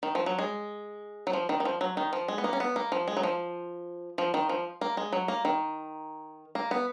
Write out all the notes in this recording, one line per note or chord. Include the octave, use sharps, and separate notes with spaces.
D#3
F3
F#3
G#3
F#3
F3
D#3
D#3
F3
F#3
D#3
F3
G#3
B3
A#3
C#4
B3
A#3
F3
G#3
F#3
F3
F3
D#3
F3
A#3
G#3
F#3
A#3
D#3
A#3
B3